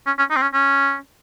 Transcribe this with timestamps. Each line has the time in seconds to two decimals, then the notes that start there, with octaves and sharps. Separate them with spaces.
0.06 C#4
0.19 C#4
0.30 D#4
0.36 C4
0.42 C#4
0.54 C#4